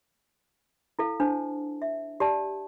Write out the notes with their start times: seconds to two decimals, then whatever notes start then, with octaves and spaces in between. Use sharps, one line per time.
0.99 E4 A4 F5
1.20 D4 C5 A5
1.82 E5
2.20 G4 D5 A5